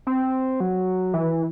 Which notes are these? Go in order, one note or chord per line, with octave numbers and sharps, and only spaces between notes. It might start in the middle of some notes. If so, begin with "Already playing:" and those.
C4
F#3
E3